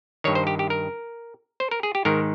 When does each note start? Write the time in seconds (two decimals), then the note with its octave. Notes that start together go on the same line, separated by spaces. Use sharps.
0.24 G2 D#3 C#5
0.35 C5
0.47 G4
0.59 G4
0.70 A#4
1.60 C5
1.71 A#4
1.83 G#4
1.95 G4
2.05 G#2 D#3 A#4